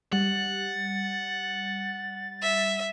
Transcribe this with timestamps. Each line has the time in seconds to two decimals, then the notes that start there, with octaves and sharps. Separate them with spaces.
0.13 G3 F#5 A6
2.42 E5